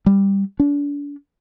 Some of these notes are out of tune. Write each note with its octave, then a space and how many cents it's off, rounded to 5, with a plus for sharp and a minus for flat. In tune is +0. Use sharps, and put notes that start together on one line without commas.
G3 +10
D4 -35